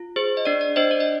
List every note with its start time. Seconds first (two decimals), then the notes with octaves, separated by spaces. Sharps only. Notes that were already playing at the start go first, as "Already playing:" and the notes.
Already playing: F4
0.16 G#4 C5
0.37 D#5
0.45 D4 D5
0.61 D5
0.76 D4 C5 D#5
0.91 D5
1.00 D#5